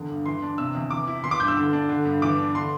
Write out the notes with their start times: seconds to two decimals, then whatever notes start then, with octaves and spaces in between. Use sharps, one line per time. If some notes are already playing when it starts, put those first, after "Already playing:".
Already playing: E2 D3
0.09 G2
0.26 E3 C6
0.42 D4
0.58 C3 E6
0.75 E2
0.91 E3 D6
1.07 E4
1.24 E3 C6
1.31 D6
1.40 G2 G6
1.48 E6
1.57 D3
1.73 D4
1.89 D3
2.05 G2
2.22 E3 D6
2.38 D4
2.54 D3 C6